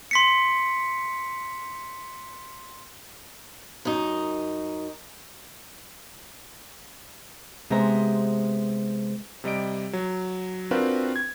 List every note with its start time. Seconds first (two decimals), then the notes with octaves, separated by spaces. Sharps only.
0.11 C6 B6 C#7
3.85 F#2 D#4
7.70 C3 G#3 B3 C5 E5 A#5
9.44 C3 G3 D#5 D7
9.93 F#3
10.71 C4 D4 F4 F#4 A#4 B4
11.16 G#6